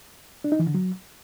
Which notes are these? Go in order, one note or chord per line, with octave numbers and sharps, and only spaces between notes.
D4
D#4
E3
D3
F#3